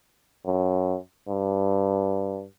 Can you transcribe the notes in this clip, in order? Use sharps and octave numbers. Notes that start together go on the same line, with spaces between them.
F#2
G2